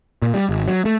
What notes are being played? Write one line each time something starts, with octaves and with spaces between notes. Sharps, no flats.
A#2
G3
G#1
F#3
A3